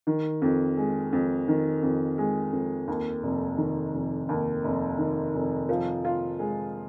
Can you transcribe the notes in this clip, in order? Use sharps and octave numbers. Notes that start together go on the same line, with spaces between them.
D#3
F2
G#3
F2
D#3
F2
G#3
F2
D#2
F1
D#3
F1
D#2
F1
D#3
F1
F3
F4
G#3